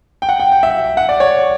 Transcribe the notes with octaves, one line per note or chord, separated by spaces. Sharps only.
G5
F#5
G5
G5
E5
F#5
D5
C#5